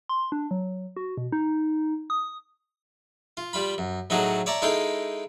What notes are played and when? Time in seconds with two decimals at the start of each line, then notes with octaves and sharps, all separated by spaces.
0.09 C6
0.32 D4
0.51 F#3
0.97 F#4
1.17 B2
1.32 D#4
2.10 D#6
3.37 F4
3.53 G3 F4 B5
3.78 F#2
4.10 A2 F#3 A3 D#4 F#4 G#4
4.46 C#5 D5 E5 A5 A#5 D6
4.62 G#3 D#4 E4 A4 F5 G5